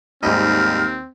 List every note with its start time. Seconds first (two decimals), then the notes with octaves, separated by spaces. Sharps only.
0.23 D#2 G#2 G3 C4 D#5 F6